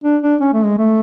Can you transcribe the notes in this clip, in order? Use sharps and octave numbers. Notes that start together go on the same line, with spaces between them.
D4
D4
C#4
A3
G#3
A3